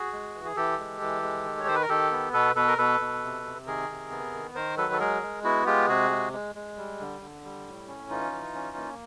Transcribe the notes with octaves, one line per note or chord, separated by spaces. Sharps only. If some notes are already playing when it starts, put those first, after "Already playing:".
Already playing: F#4 G#4
G#3
E3
G#4
E3 G4 A4
G#3
E3
G#3
D#3
C#5
D#3 C5
B4
A#4
D#3 G4 A4
B3
B2 A4 B4
B2 A4 B4
A#4
B2 A4 B4
B2
C3
C3
D#3 G#4 A#4
C3
B3
D#3
D#3 A#4 C5
F#3 A4 B4
A4
G#3 G#4 A#4
G#3
B3 E4 F#4
G#3 F4 G4
C3 F#4 G#4
G#3
G#3
G#3
G3
D3
D3
G3
A2
C#4
E3 D#4 F4
E3
C#4
A#3